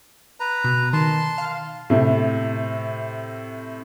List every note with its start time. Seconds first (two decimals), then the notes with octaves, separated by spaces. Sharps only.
0.40 B4 A#5
0.64 B2
0.93 D#3 A5 C6
1.38 F5
1.90 A2 C3